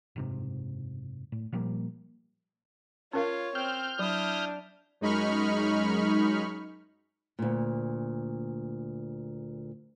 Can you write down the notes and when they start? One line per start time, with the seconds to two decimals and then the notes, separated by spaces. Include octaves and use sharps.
0.16 F#1 G#2 C3
1.32 A2
1.52 A#2 F3 G3 A#3
3.13 C#4 F4 A#4 C#5 F5
3.55 C4 F6 G6
3.99 F#3 D4 E4 D#6
5.01 F#2 G#3 D#4 B5 C#6 F6
7.39 D2 A#2